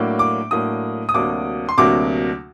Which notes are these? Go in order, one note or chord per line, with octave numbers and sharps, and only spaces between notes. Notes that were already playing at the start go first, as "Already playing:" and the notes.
Already playing: A2 F#3 A#3 D4
D6
A2 F#3 A#3 D4 D#6
D#6
D2 C3 F#3 A#3 D4 D6
C6
D2 C3 F#3 A#3 D4 D6